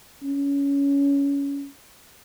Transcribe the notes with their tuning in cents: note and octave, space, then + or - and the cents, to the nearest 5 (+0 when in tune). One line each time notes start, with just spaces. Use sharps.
C#4 +20